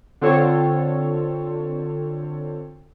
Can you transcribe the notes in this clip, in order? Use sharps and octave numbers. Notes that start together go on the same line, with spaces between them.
D3 C4 F4 A4 C#5